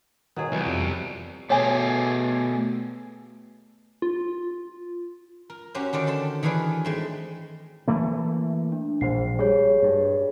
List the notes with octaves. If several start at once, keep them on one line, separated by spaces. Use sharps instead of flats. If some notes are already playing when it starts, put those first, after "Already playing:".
B2 D#3 F#3 G#4
C2 E3
F2
B2 A3 G4 G#4 C#5 G#5
F4
A#4
C#4 F#4 G4 A#4 C5
D3 D#3 D4 D5
A4 C5 A5
D#3 E3 D4 G#4 B4
G#3 A3 C4
E3 A3 A#3
D4
A#1 C5 C7
G3 G#4 C#5
G2